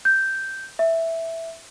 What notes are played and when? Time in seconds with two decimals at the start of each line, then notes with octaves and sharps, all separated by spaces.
0.05 G6
0.79 E5